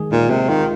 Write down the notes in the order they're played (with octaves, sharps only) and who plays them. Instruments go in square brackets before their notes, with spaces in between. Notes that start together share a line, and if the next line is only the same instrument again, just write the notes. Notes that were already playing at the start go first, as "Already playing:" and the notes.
Already playing: [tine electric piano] D#3 G#3 G#4
[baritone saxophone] A#2 [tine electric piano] D#4
[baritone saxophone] C3 [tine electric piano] G#3
[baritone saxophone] D#3 [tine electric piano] F4